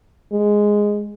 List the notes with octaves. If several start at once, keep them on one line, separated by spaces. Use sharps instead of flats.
G#3